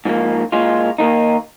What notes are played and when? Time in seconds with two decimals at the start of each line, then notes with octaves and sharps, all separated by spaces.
0.05 G#2 F3 A#3
0.52 A#2 G#3 F4
0.98 D#2 D#3 A#3 D#4